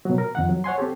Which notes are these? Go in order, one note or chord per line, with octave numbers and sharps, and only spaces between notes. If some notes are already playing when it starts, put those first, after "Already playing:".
B2 F#3
A#4
F2 D#3 F#5
F#3
C#5 F#5 G#5 C6
C4 G4 A4